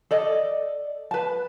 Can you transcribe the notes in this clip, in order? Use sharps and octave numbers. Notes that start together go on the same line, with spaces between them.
A4 D5 D#5
B4 A5